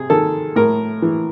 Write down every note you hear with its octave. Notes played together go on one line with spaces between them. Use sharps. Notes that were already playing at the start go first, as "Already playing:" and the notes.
Already playing: C3 G#4
D#3 A4
A2 A#4
E3